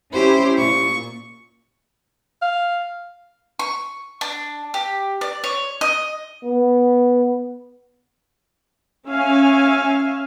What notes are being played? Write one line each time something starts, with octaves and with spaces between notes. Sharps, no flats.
C#4 E4 G4 C5
A#2 C#6
F5
C#6
D4
G4
D5
C#5
D#5
B3
C#4 E5 F5 G#5